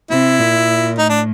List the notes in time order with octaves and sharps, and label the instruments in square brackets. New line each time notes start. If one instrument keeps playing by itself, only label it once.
[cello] C3 [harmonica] E4
[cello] A#2
[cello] A2 [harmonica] D#4
[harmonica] D4